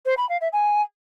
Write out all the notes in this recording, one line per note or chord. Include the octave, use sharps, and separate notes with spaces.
C5
B5
F5
E5
G#5